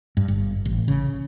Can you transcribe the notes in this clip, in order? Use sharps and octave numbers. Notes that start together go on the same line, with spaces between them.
G2
G1
A1
C#3